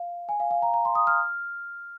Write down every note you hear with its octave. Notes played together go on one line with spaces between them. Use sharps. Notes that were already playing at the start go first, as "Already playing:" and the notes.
Already playing: F5
G#5
F5
F5
A#5
A#5
C6
D#6
F6